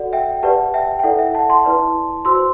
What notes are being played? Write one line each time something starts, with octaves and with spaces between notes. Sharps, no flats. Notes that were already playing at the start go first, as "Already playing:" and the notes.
Already playing: F#4 A4 D5 F#5
E5 G5
G4 B4 D5 F#5 A5
E5 G5
G5
E4 A4 D5 F#5
E5
F#5 A5
A5 C6
E4 B4 D5
F#4 C5 C6 E6